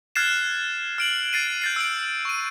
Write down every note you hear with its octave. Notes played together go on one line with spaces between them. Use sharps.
F6 F#6 G#6 A6 C7 E7
F6 D7 F#7
A6 C7 D#7
G6 A6 C7
E6 D7
C#6 D#7